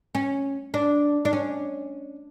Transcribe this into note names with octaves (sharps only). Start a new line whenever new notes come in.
C#4
D4
D4
C#4